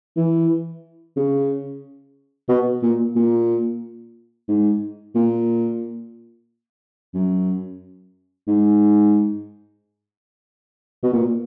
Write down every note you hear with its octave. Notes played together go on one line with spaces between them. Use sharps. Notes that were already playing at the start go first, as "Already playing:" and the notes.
E3
C#3
B2
A#2
A#2
G#2
A#2
F#2
G#2
B2
A#2